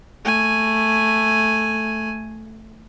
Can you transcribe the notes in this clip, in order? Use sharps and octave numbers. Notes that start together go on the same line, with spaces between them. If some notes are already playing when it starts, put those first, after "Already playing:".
A3 G#5